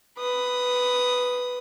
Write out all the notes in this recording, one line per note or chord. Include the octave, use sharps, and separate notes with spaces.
B4 D#6